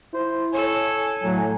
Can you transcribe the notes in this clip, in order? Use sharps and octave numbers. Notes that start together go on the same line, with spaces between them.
E4 C5
A4 C#5 G#5
A2 F#3